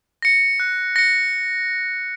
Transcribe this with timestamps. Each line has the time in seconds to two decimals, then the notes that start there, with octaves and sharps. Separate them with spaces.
0.22 A#6 C#7
0.60 F#6
0.96 A#6 C#7